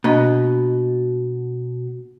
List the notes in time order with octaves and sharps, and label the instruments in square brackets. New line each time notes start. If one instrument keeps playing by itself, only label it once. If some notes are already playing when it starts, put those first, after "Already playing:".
[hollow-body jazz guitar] B2 [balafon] A#3 D4 D#5